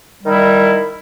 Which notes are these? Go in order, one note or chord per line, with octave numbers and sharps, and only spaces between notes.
D#3 G3 E4